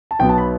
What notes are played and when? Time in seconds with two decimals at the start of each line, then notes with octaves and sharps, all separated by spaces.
0.11 A5
0.19 B1 B2 F#3 B3 G5
0.29 A5
0.38 B5